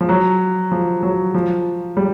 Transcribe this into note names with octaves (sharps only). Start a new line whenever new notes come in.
F3
F#3
F3
F#3
F3
G3